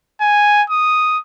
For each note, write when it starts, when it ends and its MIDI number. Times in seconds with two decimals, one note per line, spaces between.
0.21 0.63 80
0.70 1.19 87